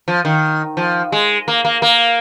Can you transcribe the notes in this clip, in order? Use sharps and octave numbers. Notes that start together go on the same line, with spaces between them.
F3
D#3
F3
G#3
A#3
A#3
A#3